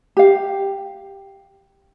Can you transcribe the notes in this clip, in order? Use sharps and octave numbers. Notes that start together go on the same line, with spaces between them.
G4 F5